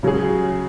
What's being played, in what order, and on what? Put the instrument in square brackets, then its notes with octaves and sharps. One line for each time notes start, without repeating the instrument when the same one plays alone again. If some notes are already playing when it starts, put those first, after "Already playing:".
[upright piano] C#3 F#3 C#4 G#4